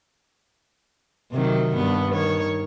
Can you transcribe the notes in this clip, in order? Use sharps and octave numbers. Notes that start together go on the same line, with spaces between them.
C3 D#3 F#3
G2 B3
D#3 C#5